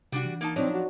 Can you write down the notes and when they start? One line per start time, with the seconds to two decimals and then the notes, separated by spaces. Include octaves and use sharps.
0.12 C3 G3 D4 F#4
0.25 E3
0.41 A#3 D#4 A5
0.56 F3 F#3 C4 D4 D#4 C#5 D5
0.72 F#4